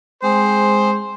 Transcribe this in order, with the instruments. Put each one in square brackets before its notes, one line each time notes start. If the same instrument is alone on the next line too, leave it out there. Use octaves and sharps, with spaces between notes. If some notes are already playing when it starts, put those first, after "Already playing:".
[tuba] G#3 [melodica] C4 G#4 [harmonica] C5